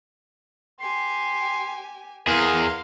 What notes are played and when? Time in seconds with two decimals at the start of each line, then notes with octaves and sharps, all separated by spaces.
0.80 G4 G#5 C6
2.27 E2 G#4 A#4 F5 C6